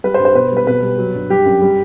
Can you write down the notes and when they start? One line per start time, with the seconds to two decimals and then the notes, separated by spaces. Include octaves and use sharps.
0.04 G3 B4
0.14 C5
0.19 G2
0.25 C5
0.35 B2 B4
0.51 G3
0.57 B4
0.67 B2 B4
0.82 G3
0.98 F#3
1.14 G2
1.30 G3 G4
1.45 F#2
1.62 G3